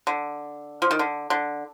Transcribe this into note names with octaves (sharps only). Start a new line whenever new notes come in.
D3
F3
D#3
D3
D3